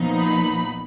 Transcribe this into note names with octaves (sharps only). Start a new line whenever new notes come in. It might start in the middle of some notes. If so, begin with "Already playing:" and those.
Already playing: A#2 F3 B3 D#4
B5